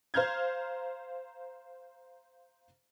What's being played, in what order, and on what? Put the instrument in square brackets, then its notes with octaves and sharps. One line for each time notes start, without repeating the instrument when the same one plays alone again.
[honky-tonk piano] C5 F5 A#5 F6 G6 G#6